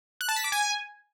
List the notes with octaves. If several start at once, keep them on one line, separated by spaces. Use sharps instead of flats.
F#6
A5
B6
D6
G#5